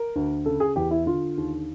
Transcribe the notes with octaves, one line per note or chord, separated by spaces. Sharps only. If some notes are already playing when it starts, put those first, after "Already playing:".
Already playing: A#4
D2
C#3 A4
G#4
E2 G4
E4
D3 F4
D#2